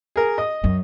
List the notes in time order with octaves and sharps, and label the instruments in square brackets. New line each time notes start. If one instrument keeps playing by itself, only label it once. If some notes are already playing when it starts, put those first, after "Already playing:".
[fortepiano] G#4 A#4
D#5 D#6
[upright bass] F#2